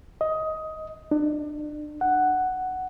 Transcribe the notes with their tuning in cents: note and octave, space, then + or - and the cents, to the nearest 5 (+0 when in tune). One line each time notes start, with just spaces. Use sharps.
D#5 +15
D4 +35
F#5 +5